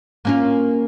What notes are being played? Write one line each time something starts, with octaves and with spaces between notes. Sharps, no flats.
A#3 C#4 F4